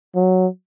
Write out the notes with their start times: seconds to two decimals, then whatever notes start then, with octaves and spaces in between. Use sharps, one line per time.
0.15 F#3